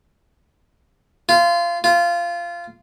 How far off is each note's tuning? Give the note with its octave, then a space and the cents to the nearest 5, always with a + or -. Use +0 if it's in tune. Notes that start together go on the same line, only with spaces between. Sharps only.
F4 -20
F4 -15